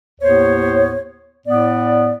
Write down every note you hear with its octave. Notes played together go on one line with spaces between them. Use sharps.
D#2 A2 B3 C5 C#5
A2 B3 D5